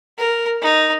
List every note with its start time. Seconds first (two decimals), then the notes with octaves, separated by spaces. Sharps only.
0.18 A#4
0.62 D#4